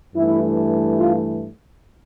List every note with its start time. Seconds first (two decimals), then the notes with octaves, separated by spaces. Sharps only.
0.15 G2 E3 A3 E4
0.98 F4